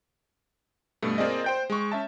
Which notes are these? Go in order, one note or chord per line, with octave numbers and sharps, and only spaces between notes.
G2 B2 A3
A#3 C4 F4 G#4 D5 D#5
C5 G5 G6
G#3 C#6
C#4 E5 A5